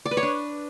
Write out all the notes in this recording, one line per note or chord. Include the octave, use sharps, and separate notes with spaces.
D5
B4
C#5
D4